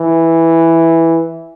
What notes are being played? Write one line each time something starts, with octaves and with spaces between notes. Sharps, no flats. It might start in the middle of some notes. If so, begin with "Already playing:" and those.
Already playing: E3